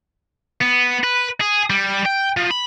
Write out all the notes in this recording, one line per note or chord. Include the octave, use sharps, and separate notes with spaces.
B3
B4
G#4
G3
G5
F3
B5